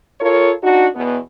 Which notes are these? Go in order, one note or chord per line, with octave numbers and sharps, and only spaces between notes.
F4 A4 A#4 C#5
D4 D#4 F#4
E2 B2 B3